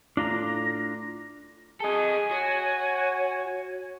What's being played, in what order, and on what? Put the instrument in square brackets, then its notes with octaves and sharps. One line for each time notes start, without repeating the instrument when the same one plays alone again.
[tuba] A2 [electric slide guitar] D4 F4 A#5 [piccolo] A#6
[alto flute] G#4 [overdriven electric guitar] A4 D#5 [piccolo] G#5
[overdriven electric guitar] F#4 [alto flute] C#5